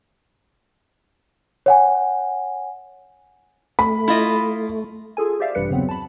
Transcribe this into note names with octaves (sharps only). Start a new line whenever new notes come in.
C#5 F#5 G#5
A3 B5
E4 F4 D#5
F4 G#4 A4 G#5
G4 C5 D5 E5 F5
A1 G2 C3 G3 B4 C#7
E2 C#3 F#3 B3 C4
A5 B5